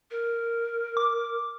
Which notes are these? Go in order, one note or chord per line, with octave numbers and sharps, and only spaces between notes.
A#4
D6